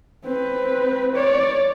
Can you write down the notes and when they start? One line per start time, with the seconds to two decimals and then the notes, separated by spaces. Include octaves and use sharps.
0.24 C4 B4
1.16 C#5 D5